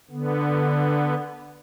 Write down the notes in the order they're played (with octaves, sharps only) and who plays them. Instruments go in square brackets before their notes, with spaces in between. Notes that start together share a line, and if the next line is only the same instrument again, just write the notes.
[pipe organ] D3 B3